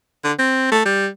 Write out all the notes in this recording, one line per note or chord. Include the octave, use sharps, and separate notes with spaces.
D3
C4
A3
G3